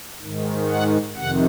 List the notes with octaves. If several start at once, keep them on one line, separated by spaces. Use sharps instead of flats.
G#2 D#3
F#5
F2 C3 D#3 F#5